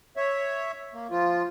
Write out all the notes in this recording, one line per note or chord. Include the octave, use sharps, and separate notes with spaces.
C#5 E5
A#3
F3 F4